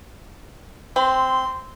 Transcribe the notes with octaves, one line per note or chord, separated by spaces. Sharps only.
C4 C6